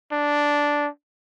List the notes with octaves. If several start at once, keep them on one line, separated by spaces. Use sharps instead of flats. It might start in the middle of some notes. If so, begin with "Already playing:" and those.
D4